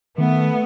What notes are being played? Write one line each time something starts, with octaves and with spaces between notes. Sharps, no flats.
D#3 A3 B3